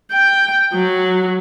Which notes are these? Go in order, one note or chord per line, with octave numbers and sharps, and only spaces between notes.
G5
F#3